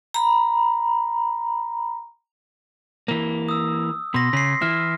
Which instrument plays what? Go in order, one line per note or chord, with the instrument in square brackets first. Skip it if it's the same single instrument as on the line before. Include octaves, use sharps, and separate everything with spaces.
[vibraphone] A#5 B5
[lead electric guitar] E3 A#3
[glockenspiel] D#6 E6
[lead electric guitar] B2 [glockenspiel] C6 A#6
[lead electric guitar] C#3 [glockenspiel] B6 C7
[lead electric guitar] E3 E4 [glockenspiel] F6